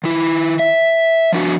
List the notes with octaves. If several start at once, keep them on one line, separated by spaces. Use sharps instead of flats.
D#3 E4
E5
F3 D4 F#4